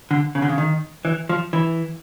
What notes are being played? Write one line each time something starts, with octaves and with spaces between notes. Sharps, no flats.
D3
C#3
D3
C#3
D#3
E3
F3
E3